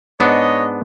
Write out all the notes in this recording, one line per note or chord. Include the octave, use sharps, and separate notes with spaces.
G#2 B3 D4 C#5 D#5